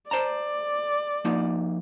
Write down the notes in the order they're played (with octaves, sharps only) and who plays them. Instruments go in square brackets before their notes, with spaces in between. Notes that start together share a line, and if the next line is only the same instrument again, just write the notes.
[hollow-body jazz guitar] C5 A5 A#5 [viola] D5
[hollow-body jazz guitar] F3 A#3 D#4